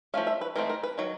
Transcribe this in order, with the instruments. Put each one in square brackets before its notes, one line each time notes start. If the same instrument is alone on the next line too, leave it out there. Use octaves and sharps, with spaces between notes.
[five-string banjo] F3 A3 C#4 F5
E5
B4
E3 A3 C4 D#4 A#4
A#4
B4
D#3 F#3